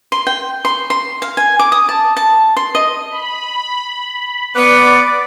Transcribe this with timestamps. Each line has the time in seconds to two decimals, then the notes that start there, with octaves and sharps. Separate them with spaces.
0.12 C6
0.27 G5
0.65 C6
0.90 C6
1.22 F5
1.37 G#5
1.59 D6
1.72 D#6
1.89 A5
2.17 A5
2.57 C6
2.75 D#5
3.11 B5
4.56 B3 B4 D5 D6